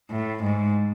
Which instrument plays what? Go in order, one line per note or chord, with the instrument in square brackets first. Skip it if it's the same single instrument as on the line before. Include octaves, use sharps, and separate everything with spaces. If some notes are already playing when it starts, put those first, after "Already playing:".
[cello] A2
G#2